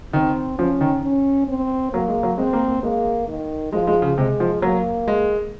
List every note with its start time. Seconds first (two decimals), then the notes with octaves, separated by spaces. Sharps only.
0.13 D#3 C4
0.58 F3 C#4
0.81 D#3
1.04 C#4
1.48 C4
1.93 F#3 A#3
2.08 G#3
2.23 F#3
2.38 G#3 C4
2.53 A#3
2.68 A#3
2.83 G#3 A#3
3.28 D#3
3.73 F3 G#3
3.87 G#3
4.02 C#3
4.17 C3 G#3
4.40 F3
4.62 F#3 A#3
5.08 G#3